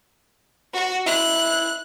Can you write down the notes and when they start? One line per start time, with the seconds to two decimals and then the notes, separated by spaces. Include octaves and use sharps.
0.73 F#4
1.06 E4 F#6